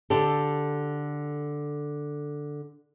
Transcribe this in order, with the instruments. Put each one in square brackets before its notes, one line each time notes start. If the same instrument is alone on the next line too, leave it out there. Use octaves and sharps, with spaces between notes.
[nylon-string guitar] D3 G4 A4